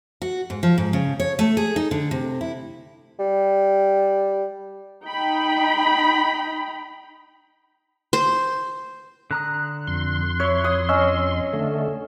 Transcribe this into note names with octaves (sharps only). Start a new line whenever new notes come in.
F#4
G#2
F3
G#2
C#3
C#5
A3
G#4
D#4
D3
C3
E4
G3
D#4 G5 B5
C5
D3 A#5 D#6 F#6
F2 C6
E4 C#5
D#6
C#4 D#5 E6
D3 A3